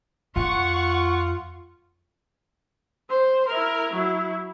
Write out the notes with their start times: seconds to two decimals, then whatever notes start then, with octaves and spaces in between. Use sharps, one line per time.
0.36 F2 F4 F#5 C#6
3.09 C5
3.47 E4 A#4
3.93 F#3 E4